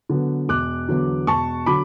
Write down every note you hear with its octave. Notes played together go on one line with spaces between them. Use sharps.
D3 F#3 B3
E1 D6 F#6
E2 D3 F#3
E1 A5 C#6
D3 F#3 B5 D6